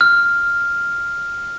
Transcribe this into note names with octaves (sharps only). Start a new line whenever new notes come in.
F6